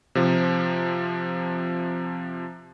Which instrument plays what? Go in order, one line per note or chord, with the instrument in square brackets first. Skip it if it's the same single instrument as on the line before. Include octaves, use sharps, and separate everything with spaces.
[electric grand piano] C3 F3